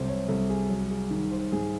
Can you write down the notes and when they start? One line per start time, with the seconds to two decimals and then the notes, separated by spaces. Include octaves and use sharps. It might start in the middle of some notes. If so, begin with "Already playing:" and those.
Already playing: C2 C3 F#3 A4 C5
0.08 C#5
0.28 C2 A4
0.49 G#4
0.69 F#3
0.90 G#4
1.10 D#3
1.31 C5
1.52 G#2 G#4